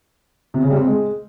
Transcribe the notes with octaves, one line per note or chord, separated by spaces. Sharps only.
C3
C#3
G3
C4
G#3